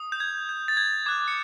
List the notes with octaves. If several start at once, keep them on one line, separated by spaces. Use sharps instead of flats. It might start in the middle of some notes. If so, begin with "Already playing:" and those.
Already playing: D#6
G6
G#6
G6
A6
G#6
D6 F#6 G#6
C#7